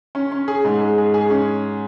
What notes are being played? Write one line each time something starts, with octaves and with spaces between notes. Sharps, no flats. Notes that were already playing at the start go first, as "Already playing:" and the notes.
C#4
C#4
G#4
G#2
G#4
G#4
G#4
C#4